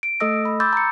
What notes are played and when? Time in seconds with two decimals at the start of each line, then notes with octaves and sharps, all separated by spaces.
0.03 D7
0.20 A3 A4 D#5 D#6 E6 A#6
0.45 B5
0.60 B5 C6 D6 E6 G6 A6
0.73 A#5 C#7